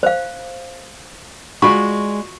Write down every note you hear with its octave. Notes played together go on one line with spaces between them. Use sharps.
C5 F5
G#3 F4 F#4 D5 B5 C#6